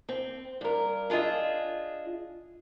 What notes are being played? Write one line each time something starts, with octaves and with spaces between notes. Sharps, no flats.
C4
G2 A#4
D4 F4 G#4 D#5 E5